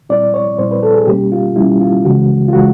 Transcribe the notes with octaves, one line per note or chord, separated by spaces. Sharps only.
A#2 G3 C4 E4 D5
C#5
A#2 G3 C4 E4 C5
B4
A4
G#4
B2 G3 A#3 C#4 G4
F4
B2 G3 A#3 C#4 E4
F4
C#2 C#3 E3 G#3 F#4
F4
C#3 E3 G#3 F#4